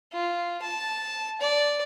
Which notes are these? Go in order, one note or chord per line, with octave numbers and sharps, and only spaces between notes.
F4
A5
D5